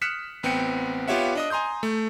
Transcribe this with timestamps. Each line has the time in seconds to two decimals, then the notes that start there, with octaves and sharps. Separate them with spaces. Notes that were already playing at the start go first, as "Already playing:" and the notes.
0.01 D#6 F6 F#6 B6 C#7 E7
0.43 A1 B3 C4 G5 C#7
1.08 B3 F4 G4 C#5 E5 F#5
1.35 D4 D#5 D#6
1.50 G#5 A#5 C6 D#6 G6
1.83 A3